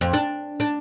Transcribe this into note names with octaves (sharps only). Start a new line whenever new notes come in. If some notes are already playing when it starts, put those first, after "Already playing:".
F2
D4
D4